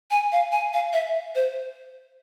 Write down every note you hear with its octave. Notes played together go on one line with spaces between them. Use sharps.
G#5
F5
G#5
F5
E5
C5